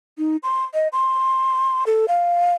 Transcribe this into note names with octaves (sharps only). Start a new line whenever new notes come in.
D#4
C6
D#5
C6
A4
F5